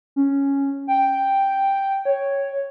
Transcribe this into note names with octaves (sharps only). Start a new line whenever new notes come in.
C#4
G5
C#5